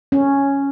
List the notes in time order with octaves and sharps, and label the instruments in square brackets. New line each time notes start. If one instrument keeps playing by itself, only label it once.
[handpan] C#4